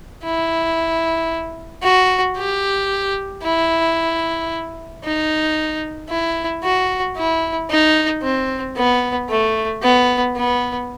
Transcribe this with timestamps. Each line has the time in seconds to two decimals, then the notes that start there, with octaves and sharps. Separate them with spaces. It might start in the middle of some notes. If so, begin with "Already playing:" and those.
0.24 E4
1.83 F#4
2.37 G4
3.43 E4
5.04 D#4
6.09 E4
6.64 F#4
7.17 E4
7.70 D#4
8.22 C4
8.76 B3
9.30 A3
9.82 B3
10.36 B3